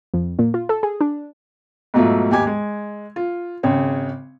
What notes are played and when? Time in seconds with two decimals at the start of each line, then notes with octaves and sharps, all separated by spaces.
0.14 F2
0.39 A#2
0.54 F4
0.69 A4
0.83 G#4
1.01 D4
1.94 G#2 B2 F#3 A3 F4 E5
2.31 D#2 G#2 G4 G#5 G#6
2.47 G#3
3.16 F4
3.63 G#1 C#3 C#5 G5